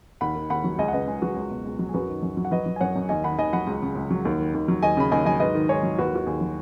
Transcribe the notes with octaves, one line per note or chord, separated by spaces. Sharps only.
D#2 F#5 B5
D#3
D#2 F#5 B5
F#3
C#2 D#5 G#5
F#5
C#3 B4 D#5
C#2 G#4
F#3 F#4 B4
C#2
B2
C#2
F#3
G#4
F#2 F#4 B4
D#3
F#2
F#3
F#5
F#3 B4 D#5
F#3
G#5
F#2 C#5 F#5
F#2
D#2 D#5 G#5
D#3 F#5 B5
D#2 D#5 G#5
F#3 F#5 B5
C#2
C#3
C#2
F#3
D#2
D#3
D#2
F#3
D#2 D#5 G#5
C#3 B5
D#2 D#5 G#5
F#3 D#5 G#5
G#2 B4 D#5
D#3
G#2 G#4 C#5
F#3
D#2 F#4 B4
D#3 F#4
D#2 G#4
F#3